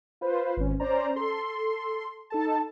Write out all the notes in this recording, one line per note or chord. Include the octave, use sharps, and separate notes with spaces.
F4 B4 C5
G#1 C#4
C#4 C5 D5 A#5
A4 C6
D#4 A4 A5